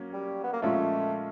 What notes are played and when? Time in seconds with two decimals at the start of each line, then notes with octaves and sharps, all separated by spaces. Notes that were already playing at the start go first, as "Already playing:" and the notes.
Already playing: F#3 A#3 C#4
0.13 G3
0.44 B3
0.53 A#3
0.62 A#2 F3 G#3 A3 C#4 F4